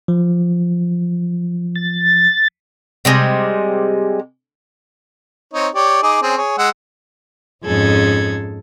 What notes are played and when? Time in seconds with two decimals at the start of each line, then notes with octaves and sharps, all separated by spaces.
0.08 F3
1.75 A6
3.05 C3 G3 G#3
5.53 C4 D#4 C#5
5.75 G4 C#5 D5
6.03 D#4 G#4 D6
6.22 C4 C#4 G#4
6.37 G#4 C#5
6.58 G#3 F#5 E6
7.64 F2 G#2 C#4 G#4 A4 G#6